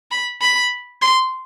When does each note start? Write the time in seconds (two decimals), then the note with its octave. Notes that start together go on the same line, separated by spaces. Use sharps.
0.11 B5
0.41 B5
1.02 C6